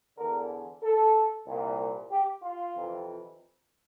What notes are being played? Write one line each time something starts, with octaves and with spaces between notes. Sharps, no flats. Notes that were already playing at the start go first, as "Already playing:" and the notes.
E2 D3 A#4
A4
C2 A#2
G4
F4
F2 C3 E3